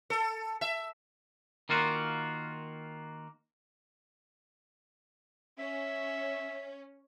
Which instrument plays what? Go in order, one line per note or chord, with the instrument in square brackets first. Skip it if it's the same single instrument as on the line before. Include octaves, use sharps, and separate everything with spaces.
[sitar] A4
E5
[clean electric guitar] D#3 A#3 F4 F#4
[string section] C#4 [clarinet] E5